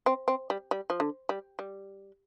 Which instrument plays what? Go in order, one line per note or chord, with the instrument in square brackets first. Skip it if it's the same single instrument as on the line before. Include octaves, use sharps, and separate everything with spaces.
[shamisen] C4
C4
G3
G3
F3
D3
G3
G3